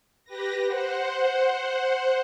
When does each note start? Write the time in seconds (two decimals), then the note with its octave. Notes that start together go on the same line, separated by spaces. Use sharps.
0.25 G4 B4 A#6
0.65 C5 F#5